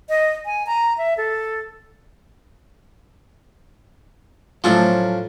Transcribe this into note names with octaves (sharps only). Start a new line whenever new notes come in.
D#5
G#5
A#5
E5
A4
A2 F3 F#3 C#4 D4 A4 C5